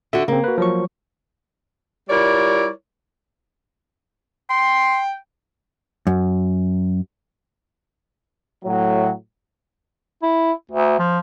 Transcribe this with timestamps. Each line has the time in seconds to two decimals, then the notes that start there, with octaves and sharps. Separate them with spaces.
0.13 D3 F#4 E5
0.28 C#3 A#3 C4
0.44 F#4 B4
0.58 F3 F#3 C#6
2.09 G3 E4 F4 A#4 C#5 D5
4.50 G5 C6
6.07 F#2
8.65 A2 F#3
10.23 E4
10.71 D2
10.99 F3